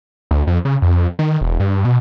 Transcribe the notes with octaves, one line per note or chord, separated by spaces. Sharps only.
D2
F2
C#3
F2
D#3
E1
G2
B2